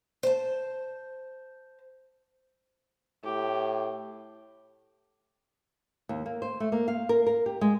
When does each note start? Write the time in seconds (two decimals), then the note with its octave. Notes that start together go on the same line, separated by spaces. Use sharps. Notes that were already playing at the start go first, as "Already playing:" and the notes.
0.23 C5 A5
3.24 A2 G4
6.09 D#2
6.26 A#3
6.42 C5
6.60 A3
6.72 A#3
6.88 F5
7.09 A#4
7.26 A#4
7.46 G4
7.61 G#3